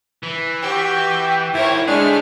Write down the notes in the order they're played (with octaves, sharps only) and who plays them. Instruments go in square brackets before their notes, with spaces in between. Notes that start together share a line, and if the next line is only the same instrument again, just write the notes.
[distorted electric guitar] E3
[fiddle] F#4 G4 [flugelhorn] G5
[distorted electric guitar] G#2 A#4 [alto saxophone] E4 [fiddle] C5 C#5
[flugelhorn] G#3 [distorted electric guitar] A3 G#4 [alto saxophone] D4 [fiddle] F6